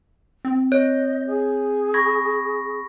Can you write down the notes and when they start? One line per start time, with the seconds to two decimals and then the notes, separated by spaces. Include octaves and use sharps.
0.45 C4
0.72 C#5 D#5 G6
1.27 G#4
1.94 B5 C#6 G#6 A#6